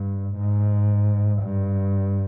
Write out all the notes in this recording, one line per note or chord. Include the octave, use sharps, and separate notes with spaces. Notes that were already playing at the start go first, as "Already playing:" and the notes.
Already playing: G2
G#2
G2